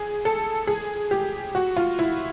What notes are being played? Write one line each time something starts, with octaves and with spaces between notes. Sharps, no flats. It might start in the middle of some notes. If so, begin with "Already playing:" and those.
Already playing: G#4
A4
G#4
G4
F#4
F4
E4